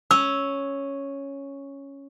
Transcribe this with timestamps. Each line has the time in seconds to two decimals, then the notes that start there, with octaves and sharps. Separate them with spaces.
0.11 C#4 E6